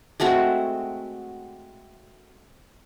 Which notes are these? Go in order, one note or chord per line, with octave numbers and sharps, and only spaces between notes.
G#3 A3 C4 F#4